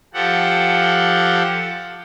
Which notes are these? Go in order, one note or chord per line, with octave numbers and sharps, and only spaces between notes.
F3 G4 A4 F#5